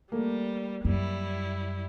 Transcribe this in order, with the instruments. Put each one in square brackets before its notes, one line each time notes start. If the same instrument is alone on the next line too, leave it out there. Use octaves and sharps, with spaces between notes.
[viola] G3 [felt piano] A3 A#3
[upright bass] F#2 [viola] G3 E4